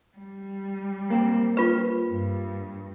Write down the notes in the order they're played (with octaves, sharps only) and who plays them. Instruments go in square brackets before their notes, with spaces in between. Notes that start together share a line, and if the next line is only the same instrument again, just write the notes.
[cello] G3
[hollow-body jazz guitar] A#3 C4
[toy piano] F4 B4
[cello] G2